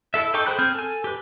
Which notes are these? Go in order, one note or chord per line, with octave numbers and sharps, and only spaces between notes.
E4 A4 E5
D#4 A4 G5 C#6 D6
G#4 C5 G5 B5 F#6
C4 G#4 F6 G6
A4 G#5
G4 B4